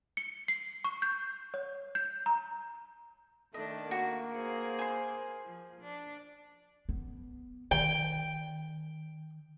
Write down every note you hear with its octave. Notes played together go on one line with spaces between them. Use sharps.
C#7
C7
C#6
G6
C#5
G6
A#5
D#3 A3 D4 D#5
A#3 F#4
G#4 C5
G#5 C6
F3
D4
B3
D#3 G5